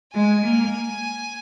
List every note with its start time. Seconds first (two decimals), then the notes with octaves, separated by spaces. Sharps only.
0.14 G#3 G#5
0.45 A#3